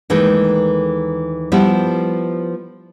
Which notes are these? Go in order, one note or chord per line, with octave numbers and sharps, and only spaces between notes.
D#2 E3 G#3 A3 D#4
F3 G3 B3 E4